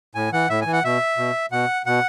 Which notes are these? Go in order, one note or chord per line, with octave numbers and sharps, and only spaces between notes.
A2 G#5
E3 F#5
A2 E5
E3 G#5
F#5
B2 E5
B2
B2 F#5
B2 F#5